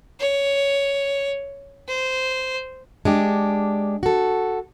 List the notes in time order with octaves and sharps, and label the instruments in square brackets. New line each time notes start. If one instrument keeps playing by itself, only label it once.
[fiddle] C#5
C5
[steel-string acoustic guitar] G#3 D4 G4
F#4 A4